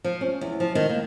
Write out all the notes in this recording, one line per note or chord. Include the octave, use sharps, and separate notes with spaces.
F3
C#4
E2
F3
D#3
A#3